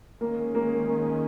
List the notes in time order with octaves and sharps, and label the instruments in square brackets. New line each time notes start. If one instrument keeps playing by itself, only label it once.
[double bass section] D#3 G#3 C#4 [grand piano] A#3
[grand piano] A#3
A#3